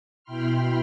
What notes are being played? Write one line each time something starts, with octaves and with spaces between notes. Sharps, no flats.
B2 E4 G5 B5 C6 F6